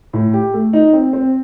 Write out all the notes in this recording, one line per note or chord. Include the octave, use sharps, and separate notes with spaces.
A2
G4
A3
D#4
C4
C4